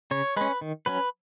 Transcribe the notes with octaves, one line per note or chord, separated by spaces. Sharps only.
C#3 C#5
G#3 C#4 B4
D#3
F#3 C#4 B4